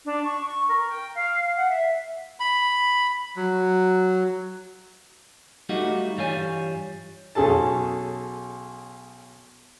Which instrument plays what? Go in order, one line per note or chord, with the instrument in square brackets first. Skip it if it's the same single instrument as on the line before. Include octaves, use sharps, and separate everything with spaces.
[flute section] D4
C#6
C#6
A#4
G5
F5
F#5
E5
[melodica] B5
F#3
[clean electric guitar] G3 A3 D#4 F4 F#4
G2 E3 G3 F4 C#5 G#5
[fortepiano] B1 C#4 G#4 A4 A5